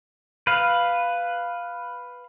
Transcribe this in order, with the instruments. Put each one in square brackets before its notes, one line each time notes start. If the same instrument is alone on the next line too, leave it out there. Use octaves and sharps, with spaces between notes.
[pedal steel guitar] B4 F5